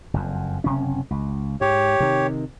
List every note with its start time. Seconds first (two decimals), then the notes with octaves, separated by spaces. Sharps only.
0.14 F#1 F2
0.64 F#1 C3 C#4
1.11 C#2
1.61 G#2 G4 C#5
2.00 C3 D#3